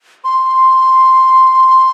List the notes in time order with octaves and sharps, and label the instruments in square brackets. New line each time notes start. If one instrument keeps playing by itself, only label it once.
[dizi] C6